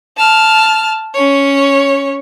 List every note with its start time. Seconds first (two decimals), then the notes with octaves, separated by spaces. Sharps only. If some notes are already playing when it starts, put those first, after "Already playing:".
0.17 A5 F6
1.14 C#4 C#5